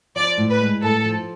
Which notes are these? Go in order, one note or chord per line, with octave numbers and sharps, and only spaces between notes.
F3 D5
A2
B4
G#3
A2 A4
F3